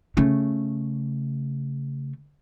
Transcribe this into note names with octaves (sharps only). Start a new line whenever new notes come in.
C#3 A3